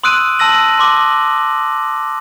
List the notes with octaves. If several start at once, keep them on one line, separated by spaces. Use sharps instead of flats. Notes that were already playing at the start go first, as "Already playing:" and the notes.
C6 D#6 E6 F#6 D7 D#7
A5 E6 A#6 F#7
C6 D6